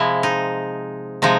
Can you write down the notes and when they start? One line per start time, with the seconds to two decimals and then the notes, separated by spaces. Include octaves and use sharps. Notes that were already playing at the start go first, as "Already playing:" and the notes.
Already playing: C3 F3 G#3 E4
0.23 D#4
1.22 C3 F3 G#3 D#4